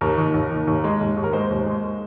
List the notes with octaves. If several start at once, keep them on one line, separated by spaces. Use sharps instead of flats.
D#2 A#4
D#3
D#2
D#3
D#2
G#3
D#2
D#2
A#4
G#3 C5
D#2
G#3